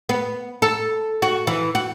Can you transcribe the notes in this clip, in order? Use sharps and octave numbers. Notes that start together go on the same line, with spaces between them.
B3
A4
F#4
E3
F#4